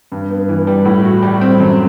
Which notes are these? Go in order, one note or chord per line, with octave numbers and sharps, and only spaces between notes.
G2
B3
E3
G3
A2
F#4
G3
C4
F#2